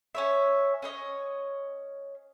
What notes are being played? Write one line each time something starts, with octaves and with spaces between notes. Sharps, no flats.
C#4 C#5 E5
C#4 C#5 D#5